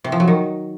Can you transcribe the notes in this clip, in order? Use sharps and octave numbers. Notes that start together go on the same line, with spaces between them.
C3
F3
F#3
D#3